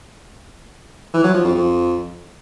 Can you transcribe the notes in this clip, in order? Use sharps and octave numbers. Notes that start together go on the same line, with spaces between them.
E3
F#3
F3
F2
F2